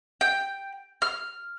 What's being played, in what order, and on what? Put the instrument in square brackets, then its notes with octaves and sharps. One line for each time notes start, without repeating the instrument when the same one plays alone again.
[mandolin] G5
F6